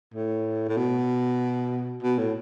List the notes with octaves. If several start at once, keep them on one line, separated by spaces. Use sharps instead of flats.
A2
A2
B2
B2
A2